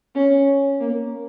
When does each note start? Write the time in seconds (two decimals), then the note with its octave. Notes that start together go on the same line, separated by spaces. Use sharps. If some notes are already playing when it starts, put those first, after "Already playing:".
0.15 C#4
0.80 A#3